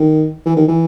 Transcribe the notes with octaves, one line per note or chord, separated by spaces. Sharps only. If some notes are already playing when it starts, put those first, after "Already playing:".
Already playing: D#3
E3
D#3
E3